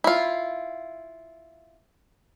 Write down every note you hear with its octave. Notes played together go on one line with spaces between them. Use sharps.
E4 F4